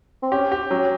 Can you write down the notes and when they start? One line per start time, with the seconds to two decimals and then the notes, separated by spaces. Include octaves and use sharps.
0.23 C4
0.32 C#4 G4
0.52 G4
0.70 F#3 C#4